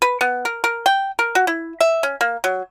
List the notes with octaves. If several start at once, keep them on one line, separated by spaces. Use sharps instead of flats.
B4
B3
A#4
A#4
G5
A#4
F#4
E4
E5
C#4
A#3
F#3